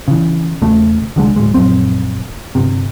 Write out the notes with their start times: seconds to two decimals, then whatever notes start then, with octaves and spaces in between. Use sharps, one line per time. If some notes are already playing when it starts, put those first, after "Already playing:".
0.08 C#3 E3
0.62 E1 C#3 A3
1.16 C2 D3 G#3
1.36 D1 G#3
1.54 A#1 F#2 C4
2.55 G1 C3